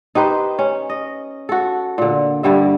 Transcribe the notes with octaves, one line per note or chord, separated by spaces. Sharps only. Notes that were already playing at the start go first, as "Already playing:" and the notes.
D#4 G4 B4 C5
C#4
D#5
F#4 A4
A#2 D3
G2 D3 G3 E5